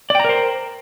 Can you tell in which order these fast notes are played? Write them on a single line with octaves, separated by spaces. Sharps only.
D5 G5 A#5 A#4 C5